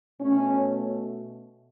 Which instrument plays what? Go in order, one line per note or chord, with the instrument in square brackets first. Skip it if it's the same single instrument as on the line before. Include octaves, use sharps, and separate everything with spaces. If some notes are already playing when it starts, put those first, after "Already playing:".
[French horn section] B2 A3 C#4